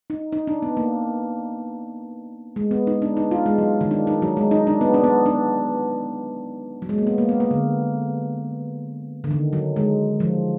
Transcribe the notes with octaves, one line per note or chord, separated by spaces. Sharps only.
D#4
D#4
D4
B3
A#3
G#3
B3
D#4
D4
D#4
F4
G#3
F#3
D#3
D4
D#4
F#3
G#3
D#4
D4
B3
D4
B3
D4
F#3
G#3
A#3
B3
A#3
B3
A#3
D3
D3
D#3
F#3
G#3
F3